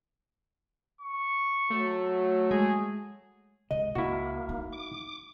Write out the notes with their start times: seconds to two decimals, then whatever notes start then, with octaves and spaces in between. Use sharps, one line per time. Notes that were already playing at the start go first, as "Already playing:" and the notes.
1.01 C#6
1.70 F#3 A3
2.51 G#3 G#4
3.71 C#2 D#5
3.95 C#2 A#3 E4 F#4
4.49 D#4
4.73 D6